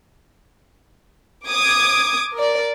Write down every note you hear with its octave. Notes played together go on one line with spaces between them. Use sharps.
D6 D#6 G#6
A#4 D5